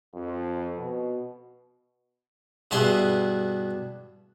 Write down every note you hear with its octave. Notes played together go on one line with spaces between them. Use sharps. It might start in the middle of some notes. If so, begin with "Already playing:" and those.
F2
B2
G2 B2 E4 G#4 E5 C6